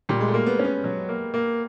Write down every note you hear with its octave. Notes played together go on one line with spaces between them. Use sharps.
A#2 G3
G#3
A3
A#3
B3
C#4
B3
F#3
A#3
A#3